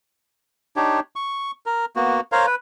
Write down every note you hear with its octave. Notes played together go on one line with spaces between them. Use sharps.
D4 D#4 G4 C#5
C#6
A#4
A#3 B3 F#4
A#4 C5 C#5 F5
B4